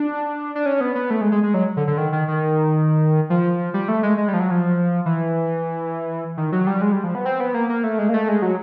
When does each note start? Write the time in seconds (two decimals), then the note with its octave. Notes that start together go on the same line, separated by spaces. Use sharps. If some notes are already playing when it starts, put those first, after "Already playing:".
Already playing: D4
0.55 D4
0.66 C#4
0.81 B3
0.95 B3
1.10 A3
1.21 G#3
1.32 G#3
1.43 G#3
1.54 F#3
1.77 D3
1.87 D3
1.98 D#3
2.12 D#3
2.28 D#3
3.30 F3
3.74 G3
3.88 A3
4.03 G#3
4.18 G#3
4.28 G3
4.34 F3
4.40 F#3
4.51 F3
5.06 E3
6.37 D#3
6.52 F#3
6.67 G3
6.81 G#3
6.92 G3
7.04 F3
7.15 B3
7.25 C4
7.40 B3
7.54 A#3
7.69 A#3
7.84 A3
7.99 G#3
8.09 A#3
8.14 A3
8.28 G#3
8.42 F#3